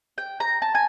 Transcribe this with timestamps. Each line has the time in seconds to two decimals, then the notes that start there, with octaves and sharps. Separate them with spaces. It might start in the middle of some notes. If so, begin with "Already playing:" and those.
0.18 G5
0.40 A#5
0.62 A5
0.75 G#5